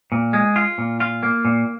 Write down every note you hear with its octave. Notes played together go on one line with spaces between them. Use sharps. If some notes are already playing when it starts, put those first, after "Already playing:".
A#2
G#3
F4
A#2
F4
A#3
A#2